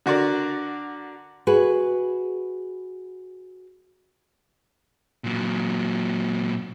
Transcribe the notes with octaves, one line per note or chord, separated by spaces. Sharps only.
D3 F#4 A#4 D5
F#4 G#4 B4
A#2 F#3